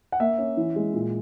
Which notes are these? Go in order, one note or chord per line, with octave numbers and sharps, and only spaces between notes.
F#5
A#3 E5
C#4
E3
G#3
A#2